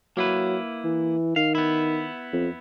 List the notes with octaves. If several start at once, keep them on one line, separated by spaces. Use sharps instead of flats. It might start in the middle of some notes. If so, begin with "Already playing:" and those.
F#3 A#3 E4 B4
E3
D#3 F5
B3 E4
F2